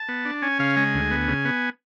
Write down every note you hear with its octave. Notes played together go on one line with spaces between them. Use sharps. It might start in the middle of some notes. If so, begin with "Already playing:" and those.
Already playing: A5
B3
D4
C#4 G#5
C#3 F5
G#3 G#5
D2
B3
C#3
B3